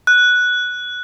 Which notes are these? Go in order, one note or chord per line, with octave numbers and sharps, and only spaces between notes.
F#6